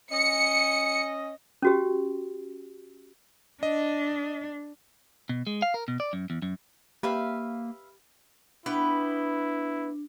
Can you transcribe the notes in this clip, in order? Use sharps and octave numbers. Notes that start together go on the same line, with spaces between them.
C#4 D#5 C#7
C#4 F#4 G4
D4 D#5
B2
G#3
F5
A#4
B2
D5
F#2
E2
F#2
A#3 G4 B4 E5 F5
B3 D4 E4 B4 G5